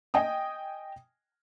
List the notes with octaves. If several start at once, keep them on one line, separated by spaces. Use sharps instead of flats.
D#5 G5 G#5 D#6